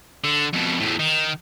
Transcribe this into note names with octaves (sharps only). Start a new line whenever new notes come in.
D3
F2 B2
E2 A2
D#3